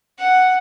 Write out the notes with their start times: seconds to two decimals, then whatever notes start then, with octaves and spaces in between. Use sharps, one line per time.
0.19 F#5